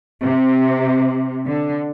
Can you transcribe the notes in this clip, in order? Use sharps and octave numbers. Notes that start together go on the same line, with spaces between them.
C3
D3